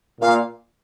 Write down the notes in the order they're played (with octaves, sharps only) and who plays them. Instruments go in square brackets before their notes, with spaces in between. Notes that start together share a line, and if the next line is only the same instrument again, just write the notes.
[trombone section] A#2 [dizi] F5